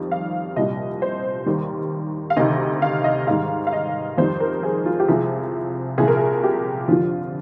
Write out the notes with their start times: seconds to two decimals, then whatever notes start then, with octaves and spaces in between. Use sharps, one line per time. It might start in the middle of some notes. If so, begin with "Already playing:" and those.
Already playing: F2 D#3 G3
0.12 F5
0.56 C2 A#2 G3 D#5
1.02 C5
1.46 D#2 D#3 G3
2.30 F5
2.37 D2 C3 D#3 D#5
2.82 F5
3.04 D#5
3.27 G#2 D#3 G3 F5
3.67 F5
3.73 D#5
4.18 F2 D#3 G3 C5
4.40 A#4
4.63 G#4
4.86 F4
5.00 G4
5.08 C2 C3 F3 G#4
5.98 C2 A#2 F3 G#4
6.08 A#4
6.17 G#4
6.44 G4
6.88 F2 D3 F3 F4